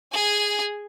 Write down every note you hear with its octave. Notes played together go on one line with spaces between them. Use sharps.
G#4 G#5